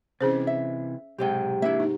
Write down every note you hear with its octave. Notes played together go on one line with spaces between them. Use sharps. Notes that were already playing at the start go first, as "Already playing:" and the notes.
C3 E3 C#4 G#4 C5
E5
B1 G#2 C3 G4 G5
A#3 D4 E4 E5
D#4